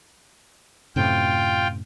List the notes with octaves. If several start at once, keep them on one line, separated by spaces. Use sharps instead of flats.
F#2 A2 C3 F4 G5